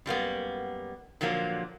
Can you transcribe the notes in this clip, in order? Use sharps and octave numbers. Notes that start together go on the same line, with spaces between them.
F#2 G3 A#3 B3
A#2 D3 F3 F#3 A#3